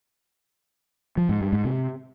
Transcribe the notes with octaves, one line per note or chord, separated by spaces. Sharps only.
F3
G#2
G2
G#2
C3